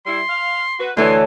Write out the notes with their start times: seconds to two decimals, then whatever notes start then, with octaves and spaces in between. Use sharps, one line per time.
0.06 G3 E4 C6
0.29 F5
0.79 F#4 B4
0.97 D2 E3 A4 C#5 C6